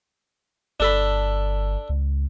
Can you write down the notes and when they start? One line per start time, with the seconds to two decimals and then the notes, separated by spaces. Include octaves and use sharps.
0.80 G1 D4 A4 B5
1.89 C#2